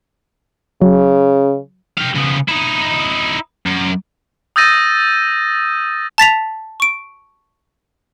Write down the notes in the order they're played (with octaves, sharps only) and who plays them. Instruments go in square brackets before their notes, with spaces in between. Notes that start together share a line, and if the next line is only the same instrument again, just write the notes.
[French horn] C#3 [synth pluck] F#3
[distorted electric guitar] G4 F5
C#3 B3
D#4 E4
F#2
[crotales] D#6 E6 G6 A6 A#6 D#7
[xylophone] A5 A6 B6 F7
C#6 D7